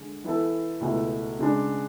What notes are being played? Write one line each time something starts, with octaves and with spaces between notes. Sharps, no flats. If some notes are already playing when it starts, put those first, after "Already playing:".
Already playing: D3 G#3
E3 B3 E4 A4
C#2 B2 A3 E4
C#3 G#3 D4